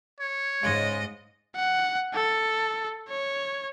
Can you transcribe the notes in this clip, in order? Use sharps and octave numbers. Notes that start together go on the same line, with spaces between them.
C#5
G#2 C#3 G#3 D#5
F#5
A4
C#5